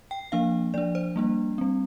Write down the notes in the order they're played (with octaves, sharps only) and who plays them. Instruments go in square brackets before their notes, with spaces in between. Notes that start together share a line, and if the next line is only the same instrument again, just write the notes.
[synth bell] G5
F3 A#3 D4 F5
F3 D4 D5
C5
G3 A#3 D4
G3 C4